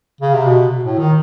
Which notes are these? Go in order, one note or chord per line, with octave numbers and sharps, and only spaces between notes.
C#3
C3
B2
A2
D#3